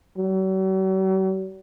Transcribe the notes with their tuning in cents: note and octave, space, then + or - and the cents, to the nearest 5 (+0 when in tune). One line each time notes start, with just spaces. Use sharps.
F#3 +45